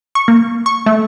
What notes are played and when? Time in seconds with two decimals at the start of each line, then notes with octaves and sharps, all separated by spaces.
0.15 C#6
0.28 A#3
0.66 C#6
0.86 A3